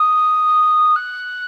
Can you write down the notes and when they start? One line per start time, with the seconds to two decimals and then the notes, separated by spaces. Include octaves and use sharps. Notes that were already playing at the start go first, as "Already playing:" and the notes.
Already playing: D#6
0.96 F#6